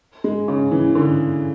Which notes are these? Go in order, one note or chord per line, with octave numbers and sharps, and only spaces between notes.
G#3
C#3
E3
D3